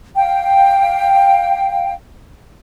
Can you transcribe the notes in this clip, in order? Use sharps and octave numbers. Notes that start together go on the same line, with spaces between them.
F5 G5